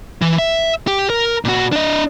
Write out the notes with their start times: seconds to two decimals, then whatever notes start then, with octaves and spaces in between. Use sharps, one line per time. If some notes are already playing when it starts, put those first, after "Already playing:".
0.22 E3
0.39 E5
0.87 G4
1.10 A#4
1.45 A#2 F#4
1.72 D4 D#5